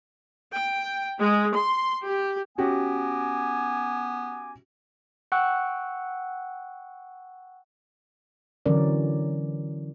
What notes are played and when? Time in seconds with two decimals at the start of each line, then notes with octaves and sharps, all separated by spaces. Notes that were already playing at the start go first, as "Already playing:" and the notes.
0.53 G5
1.18 G#3
1.52 C6
2.06 G4
2.58 B3 C#4 F#4 G4 G#5 D6
5.32 F#5 G5 C#6 E6 F#6
8.66 D3 E3 F#3 C#4 A#4 D5